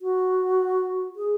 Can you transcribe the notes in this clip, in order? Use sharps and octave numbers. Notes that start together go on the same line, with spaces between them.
F#4
G#4